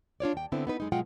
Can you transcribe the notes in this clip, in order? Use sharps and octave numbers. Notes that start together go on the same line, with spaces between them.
D4 F4 C#5 D5
D#2 G5
D3 B3 C4 E4
B3 D#4 B4
F#2 G#3 D#4
B2 F#3 G#3 F4 F#5 G5